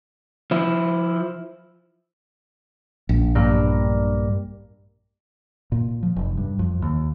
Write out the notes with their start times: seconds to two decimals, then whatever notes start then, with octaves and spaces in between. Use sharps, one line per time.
0.51 F3 E4
3.09 A#1
3.35 G2 A#3
5.72 A#2
6.03 F3
6.16 F1
6.37 G2
6.59 F2
6.82 D#2